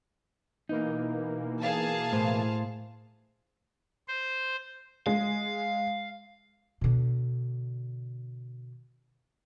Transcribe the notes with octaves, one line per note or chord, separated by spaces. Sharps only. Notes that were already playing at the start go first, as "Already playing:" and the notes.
B2 E3 A#3 D#4
G#4 F5 A5
A2 C5
C5
G#3 F5
B2 D3